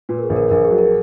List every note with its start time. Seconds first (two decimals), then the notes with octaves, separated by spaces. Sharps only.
0.09 A#2 B4
0.19 A#4
0.23 G#4
0.30 A#1
0.36 A#4
0.50 A#1 A#4
0.65 G#4
0.70 F#3
0.78 A#4